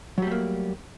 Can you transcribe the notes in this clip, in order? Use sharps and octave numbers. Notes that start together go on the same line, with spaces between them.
F#3 G3 A3 A#3